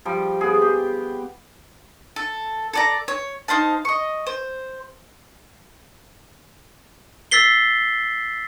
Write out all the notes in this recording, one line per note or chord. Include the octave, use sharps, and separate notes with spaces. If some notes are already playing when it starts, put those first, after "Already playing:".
F3 G3
B3 G#4
G4
A4
A4 D5 A#5
C#5
D#4 C5 F5 A5
D#5 C#6
C5
E6 A6 B6 C7 G7